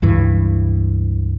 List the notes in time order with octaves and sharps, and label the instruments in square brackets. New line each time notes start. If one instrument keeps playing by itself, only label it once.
[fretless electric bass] C#2 G2 E3